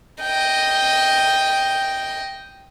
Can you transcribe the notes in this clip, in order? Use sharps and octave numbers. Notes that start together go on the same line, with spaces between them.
D#5 G5